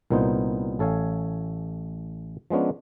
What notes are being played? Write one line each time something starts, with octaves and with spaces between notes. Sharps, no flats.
C2 A#2 B3 D#4 C5
A1 A4 C#5 F5 G#5
F3 G#3 B3 C#4 D4